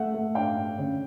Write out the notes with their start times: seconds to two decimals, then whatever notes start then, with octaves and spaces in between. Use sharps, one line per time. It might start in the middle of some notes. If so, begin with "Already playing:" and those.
Already playing: A3 E5 F#5
0.14 A3
0.35 D4 F5 G5
0.57 D4
0.78 C#3